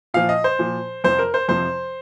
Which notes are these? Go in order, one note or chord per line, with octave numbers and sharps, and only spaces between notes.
A#2 F3 F5
D#5
C5
A#2 F3
F2 C3 F3 C5
A#4
C5
F2 C3 F3 C5